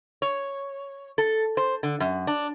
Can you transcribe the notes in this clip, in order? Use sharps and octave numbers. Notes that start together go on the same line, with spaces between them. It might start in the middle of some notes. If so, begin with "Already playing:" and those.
C#5
A4
C5
D3
F#2
D4